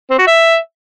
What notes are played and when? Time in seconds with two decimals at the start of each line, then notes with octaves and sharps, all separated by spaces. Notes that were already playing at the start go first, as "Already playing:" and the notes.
0.10 C4
0.19 F#4
0.27 E5